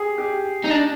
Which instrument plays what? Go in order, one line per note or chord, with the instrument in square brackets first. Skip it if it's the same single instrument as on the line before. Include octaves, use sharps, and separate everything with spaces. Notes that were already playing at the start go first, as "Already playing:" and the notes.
Already playing: [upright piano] G4 G#4
G4
[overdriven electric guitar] D#4
D4